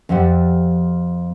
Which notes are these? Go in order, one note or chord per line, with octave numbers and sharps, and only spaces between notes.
F2 F3 G4 A4 F#5